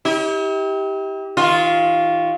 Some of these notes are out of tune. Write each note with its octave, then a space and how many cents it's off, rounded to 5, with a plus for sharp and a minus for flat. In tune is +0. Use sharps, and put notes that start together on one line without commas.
E4 -45 G4 +0
D#3 +30 F4 +0